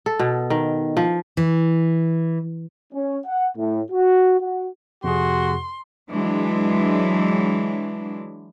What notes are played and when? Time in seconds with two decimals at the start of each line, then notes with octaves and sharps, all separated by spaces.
0.06 A4
0.19 B2
0.50 D#3
0.97 F3
1.37 E3
2.93 C#4
3.26 F#5
3.57 A2
3.91 F#4
4.40 F#4
5.04 F2 C3 F#4 G#4 C6
6.11 E3 F#3 G#3 D4